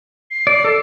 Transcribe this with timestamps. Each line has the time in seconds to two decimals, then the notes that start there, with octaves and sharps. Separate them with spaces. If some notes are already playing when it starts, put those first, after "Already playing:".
0.31 C7
0.47 D5
0.64 A4